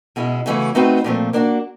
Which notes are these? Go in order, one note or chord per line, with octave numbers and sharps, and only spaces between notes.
B2 G#3 C#4 E4
C#3 E3 A3 C#4 F#4
A3 C4 D#4 F#4 B4
A#2 F3 A3 C4
A#3 D4 F#4